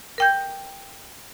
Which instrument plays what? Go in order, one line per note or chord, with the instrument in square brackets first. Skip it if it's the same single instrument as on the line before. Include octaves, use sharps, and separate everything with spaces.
[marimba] A#4 G5 G6